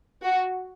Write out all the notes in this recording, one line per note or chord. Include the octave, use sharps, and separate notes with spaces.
F#4